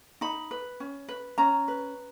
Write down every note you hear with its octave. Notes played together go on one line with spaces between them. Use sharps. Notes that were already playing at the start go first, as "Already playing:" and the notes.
D#4 B5
B4
C#4
B4
C#4 A#5
B4